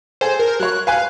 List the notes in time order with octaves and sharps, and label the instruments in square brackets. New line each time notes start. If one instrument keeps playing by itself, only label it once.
[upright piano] G#4 A4 [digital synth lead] C5
[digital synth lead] A#4
[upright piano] F#3 C#5 [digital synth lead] F#6
[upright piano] B4 G#5 F#6 [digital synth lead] F5